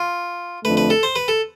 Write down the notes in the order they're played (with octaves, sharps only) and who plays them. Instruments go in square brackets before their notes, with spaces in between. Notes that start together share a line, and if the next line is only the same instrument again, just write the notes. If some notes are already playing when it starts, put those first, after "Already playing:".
Already playing: [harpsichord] F4
[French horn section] F2 D3 A3 [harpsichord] B4
[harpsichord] B4
A4
C5
B4
A4